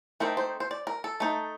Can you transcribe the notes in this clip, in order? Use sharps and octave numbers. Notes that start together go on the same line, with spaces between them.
A3 C4 D#4 A#4
C5
C5
D5
A#4
A4
A3 D#4